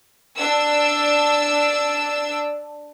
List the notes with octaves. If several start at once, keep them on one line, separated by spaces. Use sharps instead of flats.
D4 E6